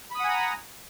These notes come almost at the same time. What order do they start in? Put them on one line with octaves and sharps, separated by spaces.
B5 D#6 F#5 G#5 A#5